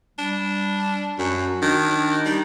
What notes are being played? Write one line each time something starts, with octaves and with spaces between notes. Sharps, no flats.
G3 D4
F#2 F#4
D#3 D4
G3 D#4